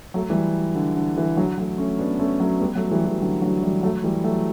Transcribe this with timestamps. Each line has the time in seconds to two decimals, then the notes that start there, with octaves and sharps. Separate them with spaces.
0.14 F#3 A3
0.30 E3 G3
0.75 D3
0.97 D3
1.18 E3
1.37 D3 F#3
1.58 F#3 A3
1.78 A3 C#4
1.99 B3 D4
2.19 A3 C#4
2.40 F#3 A3
2.60 G3 B3
2.75 F#3 A3
2.91 E3 G3
3.06 E3
3.22 D3 F#3
3.42 D3 F#3
3.63 E3 G3
3.83 F#3 A3
4.04 E3 G3
4.24 F#3 A3